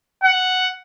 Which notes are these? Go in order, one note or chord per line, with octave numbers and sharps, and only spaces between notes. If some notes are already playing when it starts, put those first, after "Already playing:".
F#5